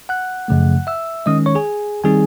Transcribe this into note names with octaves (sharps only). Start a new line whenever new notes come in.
F#5 F#6
F#2 C#3 F3 A3
E5 E6
D#3 G#3 C#4 D#5 D#6
C#5 C#6
G#4 G#5
D#3 G3 C4 D#4 G#4 G#5